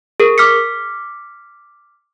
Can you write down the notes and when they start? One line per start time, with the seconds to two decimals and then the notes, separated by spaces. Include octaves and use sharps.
0.20 G#4 A#4
0.38 D6 F6 B6 C#7